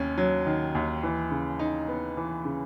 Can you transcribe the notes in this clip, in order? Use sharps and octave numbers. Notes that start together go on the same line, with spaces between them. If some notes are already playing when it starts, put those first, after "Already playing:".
Already playing: D#2 C#4
F#3
D#3
D#2
E3
C#3
D#4
B3
E3
C#3